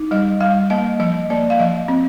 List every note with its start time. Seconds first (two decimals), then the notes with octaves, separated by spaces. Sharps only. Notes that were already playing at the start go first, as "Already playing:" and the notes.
Already playing: D#4
0.11 G3 D#5
0.41 G3 F5
0.70 A#3 D#5
1.00 F3 D#5
1.30 A#3 D5
1.50 F5
1.59 F3 D#5
1.88 C4